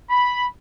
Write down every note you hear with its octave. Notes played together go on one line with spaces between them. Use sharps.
B5